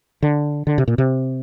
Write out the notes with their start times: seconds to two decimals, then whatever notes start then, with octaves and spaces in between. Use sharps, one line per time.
0.22 D3
0.67 D3
0.78 C3
0.88 A#2
0.98 C3